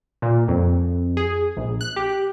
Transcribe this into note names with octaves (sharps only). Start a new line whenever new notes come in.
A#2
F2
G#4
A#1
F#6
G4